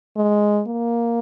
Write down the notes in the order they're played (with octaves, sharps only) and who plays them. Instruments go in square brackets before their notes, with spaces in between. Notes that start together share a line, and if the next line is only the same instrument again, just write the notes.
[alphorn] G#3
A#3